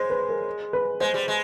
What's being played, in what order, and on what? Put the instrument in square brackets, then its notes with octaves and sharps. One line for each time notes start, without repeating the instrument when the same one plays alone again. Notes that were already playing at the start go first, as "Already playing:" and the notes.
Already playing: [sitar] G#3 [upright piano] C5 C#5
[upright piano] B4
A#4
B4
[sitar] G#3 [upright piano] C5
[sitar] G3
G#3